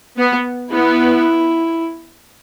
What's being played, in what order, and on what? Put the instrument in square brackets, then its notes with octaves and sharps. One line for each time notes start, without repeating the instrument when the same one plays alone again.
[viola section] B3
[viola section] B3 [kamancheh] E4